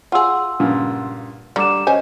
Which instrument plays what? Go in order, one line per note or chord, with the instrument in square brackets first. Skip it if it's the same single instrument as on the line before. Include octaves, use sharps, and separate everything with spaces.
[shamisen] F4 G#4 [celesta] F#5 C6 E6
[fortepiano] G2 A#2 C#3
[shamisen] D3 [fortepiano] G3 [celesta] A#5 D6 E7
[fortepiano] C#4 [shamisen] C5 G#5 [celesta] D#5